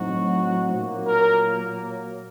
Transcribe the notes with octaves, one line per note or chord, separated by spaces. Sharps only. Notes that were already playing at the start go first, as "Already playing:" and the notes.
Already playing: A2 F#3 C4 D#4 F#4
A#2 F#3 A#3
A#4